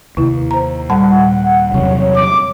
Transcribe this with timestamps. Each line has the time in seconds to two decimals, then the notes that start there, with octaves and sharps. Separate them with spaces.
0.17 D#2 C3 E4
0.51 C5 A#5
0.90 A#2 G3 F#5 A5
1.74 E2 C3 F#3 C#5
2.16 D6